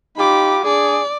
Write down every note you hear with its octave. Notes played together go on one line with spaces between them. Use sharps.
D#4 F4 G4 B5 D6
D4 G#4 D5